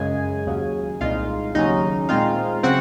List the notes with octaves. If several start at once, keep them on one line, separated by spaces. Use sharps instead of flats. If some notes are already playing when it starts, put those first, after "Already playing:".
Already playing: F#2 C#3 G#3 G#4 G#5
D#2 C#3 F#3
C2 A#2 G#3 D#4 F4 F5
D#2 C#3 F#3 C#4 D#4 D#5
A#2 G#3 C4 D#4 F4 F5
C#3 F#3 C4 F#4 F#5